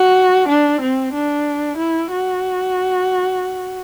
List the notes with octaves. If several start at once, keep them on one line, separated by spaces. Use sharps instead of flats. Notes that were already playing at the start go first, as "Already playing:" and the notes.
Already playing: F#4
D4
C4
D4
E4
F#4